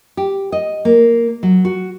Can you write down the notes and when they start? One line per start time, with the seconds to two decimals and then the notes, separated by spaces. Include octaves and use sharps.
0.17 G4
0.52 D#5
0.85 A#3
1.43 F#3
1.65 F#4